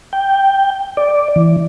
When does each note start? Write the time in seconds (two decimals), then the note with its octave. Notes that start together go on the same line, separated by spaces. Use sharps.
0.13 G5
0.97 D5
1.36 E3